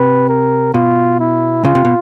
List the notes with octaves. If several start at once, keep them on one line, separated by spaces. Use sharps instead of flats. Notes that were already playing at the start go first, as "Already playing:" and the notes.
Already playing: C3 B4
A#4
B2 F4
E4
C#3 F4
C3
B2